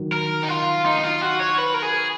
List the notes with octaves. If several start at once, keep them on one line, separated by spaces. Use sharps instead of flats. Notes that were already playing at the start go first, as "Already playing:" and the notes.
Already playing: D#3 F#3
A#4
D#4
F4
D#4
D#4
F4
F#4
C#5
B4
A#4
G#4